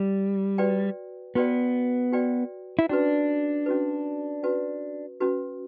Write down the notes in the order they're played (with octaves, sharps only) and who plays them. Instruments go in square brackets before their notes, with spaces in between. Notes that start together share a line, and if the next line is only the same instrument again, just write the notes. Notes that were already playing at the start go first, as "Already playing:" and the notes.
Already playing: [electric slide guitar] G3
[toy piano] F#4 B4 D5 G5
[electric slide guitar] B3 [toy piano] F#4 B4 D5 G5
[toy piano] F#4 B4 D5 G5
[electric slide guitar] E4
[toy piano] C#4 F#4 B4 [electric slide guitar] D4
[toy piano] C#4 F#4 B4
C#4 F#4 B4
C#4 F#4 B4